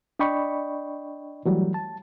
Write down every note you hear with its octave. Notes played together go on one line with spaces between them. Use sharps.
D4 D5 D#5 G5 B5 C#6
E3 F#3 G3 A3
A5